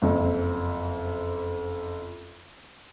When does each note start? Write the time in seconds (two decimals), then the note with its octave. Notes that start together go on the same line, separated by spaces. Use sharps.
0.02 F#1 F2